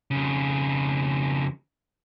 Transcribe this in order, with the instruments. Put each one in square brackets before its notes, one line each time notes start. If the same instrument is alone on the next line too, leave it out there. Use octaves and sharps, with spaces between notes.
[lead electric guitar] F2 C#3